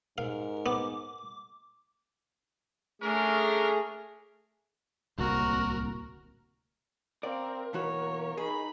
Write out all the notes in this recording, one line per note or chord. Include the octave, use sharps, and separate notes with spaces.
G#2 A#4 F5
B3 D6
A3 C#4 D4 G#4 A#4
D1 C2 A#3 F#4 A#4
C4 A#4 D5 F5
B1 E3 A#3 F#4 C#5
D#4 G#4 B5